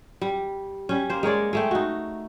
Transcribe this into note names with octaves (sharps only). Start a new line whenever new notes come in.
G3
G3 C#4
A#3 C5
G#3 A#4 C#5 D5
G#3 A3 G5
D#4 F#4